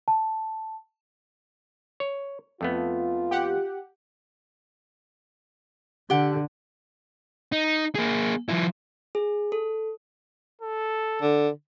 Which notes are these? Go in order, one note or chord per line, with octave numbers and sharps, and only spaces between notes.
A5
C#5
F2 A3 B3 F4
G4 F#5
D3 G4 F#5
D#4
A#3 G#4
F3 E4
G#4
A4
A4
D3